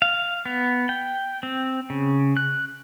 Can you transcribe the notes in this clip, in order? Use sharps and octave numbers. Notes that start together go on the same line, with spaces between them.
F5
B3
G5
C4
C#3
F#6